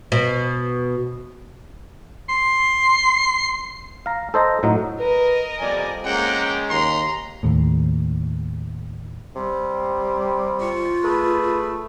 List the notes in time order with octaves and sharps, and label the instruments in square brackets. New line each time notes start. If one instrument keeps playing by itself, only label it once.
[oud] B2
[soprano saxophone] C6
[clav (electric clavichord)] F5 A#5
A4 C5 D#5 A#5
A2 F#3 D#4
[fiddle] A#4 D#5 [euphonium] B4
[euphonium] F2 [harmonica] G3 D5 G#5
[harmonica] G#3 C#4 [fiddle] A#3 G5 [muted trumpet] F#5
[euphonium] D#2 [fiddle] A#5 [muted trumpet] C6
[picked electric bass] D#2 A2
[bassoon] C3 [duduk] G3
[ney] F4 [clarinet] C#6
[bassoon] A3 [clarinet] G#4 [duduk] B4